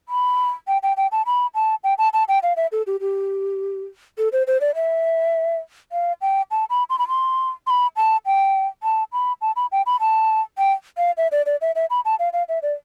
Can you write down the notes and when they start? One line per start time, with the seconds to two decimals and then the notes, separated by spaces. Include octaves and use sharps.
0.09 B5
0.68 G5
0.83 G5
0.97 G5
1.12 A5
1.26 B5
1.55 A5
1.84 G5
1.98 A5
2.13 A5
2.29 G5
2.43 F5
2.57 E5
2.72 A4
2.87 G4
3.01 G4
4.18 A4
4.33 C5
4.47 C5
4.61 D5
4.75 E5
5.92 F5
6.22 G5
6.51 A5
6.70 B5
6.90 C6
6.99 B5
7.08 C6
7.67 C6
7.70 B5
7.97 A5
8.26 G5
8.83 A5
9.12 B5
9.42 A5
9.56 B5
9.72 G5
9.86 B5
10.00 A5
10.58 G5
10.98 F5
11.17 E5
11.32 D5
11.46 D5
11.61 E5
11.75 E5
11.90 B5
12.05 A5
12.19 F5
12.33 F5
12.49 E5
12.62 D5